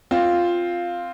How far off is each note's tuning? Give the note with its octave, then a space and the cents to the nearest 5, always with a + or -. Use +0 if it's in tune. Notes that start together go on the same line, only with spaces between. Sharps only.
C4 +0 F4 +0